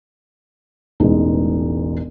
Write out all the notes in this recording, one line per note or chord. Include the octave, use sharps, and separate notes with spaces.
E1 A1 E3 G#3 D#4